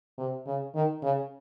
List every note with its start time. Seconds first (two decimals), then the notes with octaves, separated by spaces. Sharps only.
0.18 C3
0.46 C#3
0.75 D#3
1.03 C#3